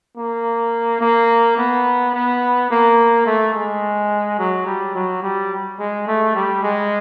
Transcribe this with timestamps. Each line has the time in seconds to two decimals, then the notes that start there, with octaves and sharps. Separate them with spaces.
0.17 A#3
1.01 A#3
1.58 B3
2.14 B3
2.71 A#3
3.26 A3
3.54 G#3
4.39 F#3
4.66 G3
4.95 F#3
5.23 G3
5.79 G#3
6.07 A3
6.35 G3
6.63 G#3